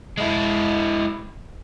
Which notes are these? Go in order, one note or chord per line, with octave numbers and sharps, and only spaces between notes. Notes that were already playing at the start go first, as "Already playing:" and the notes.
G#3 E4